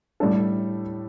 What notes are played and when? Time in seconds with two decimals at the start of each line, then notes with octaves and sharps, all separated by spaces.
0.20 A2 G3 D4 A4